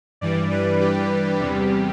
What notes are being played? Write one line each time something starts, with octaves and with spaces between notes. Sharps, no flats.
G2 E3 G3 D5
B4
G4
E2 C3 G3